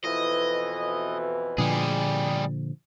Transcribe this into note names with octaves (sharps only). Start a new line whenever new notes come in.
F2 B2 E3 D#5
A#2 D3 F3 G3 G#4